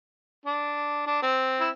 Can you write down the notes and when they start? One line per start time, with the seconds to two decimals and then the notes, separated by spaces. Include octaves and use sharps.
0.46 D4
1.07 D4
1.22 C4
1.60 E4